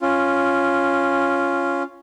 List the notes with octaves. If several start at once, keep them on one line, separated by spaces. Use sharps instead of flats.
C#4 F4